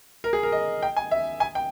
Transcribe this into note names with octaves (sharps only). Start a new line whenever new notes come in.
A#4
G#4
A#4
D#5
G5
G#5
E5
G#5
G5